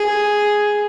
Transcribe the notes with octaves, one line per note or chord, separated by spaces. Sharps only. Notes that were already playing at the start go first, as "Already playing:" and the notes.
Already playing: G#4